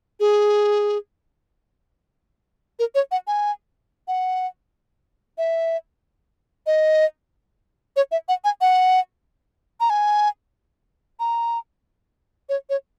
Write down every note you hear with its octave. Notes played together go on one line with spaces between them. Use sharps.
G#4
A#4
C#5
F#5
G#5
F#5
E5
D#5
C#5
E5
F#5
G#5
F#5
A#5
G#5
A#5
C#5
C#5